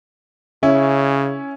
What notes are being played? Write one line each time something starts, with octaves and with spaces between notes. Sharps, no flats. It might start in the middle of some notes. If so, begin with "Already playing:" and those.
C#3 C#4 E4